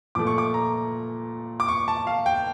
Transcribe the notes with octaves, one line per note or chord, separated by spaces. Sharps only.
A#2 F3 A3 D6
C#6
D6
A#5
D6
C#6
A5
F5
G5